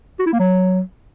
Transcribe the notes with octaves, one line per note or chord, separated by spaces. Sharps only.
F#4
E4
A#3
F#3